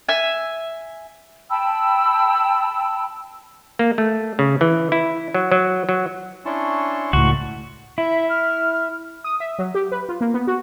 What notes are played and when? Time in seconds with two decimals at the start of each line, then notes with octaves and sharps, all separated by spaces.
0.09 E5 G#5
1.50 G5 A5 B5 E6
3.79 A#3
3.98 A3
4.39 C#3
4.61 E3
4.92 E4
5.34 F#3
5.52 F#3
5.89 F#3
6.45 C#4 D4 E4 A5 C6 C#6
7.13 C#2 A2 F#4
7.98 E4 E5
8.29 F6
9.24 D#6
9.40 E5
9.59 F#3
9.75 G4
9.92 B4
10.09 F4
10.21 A#3
10.34 B3
10.47 F#4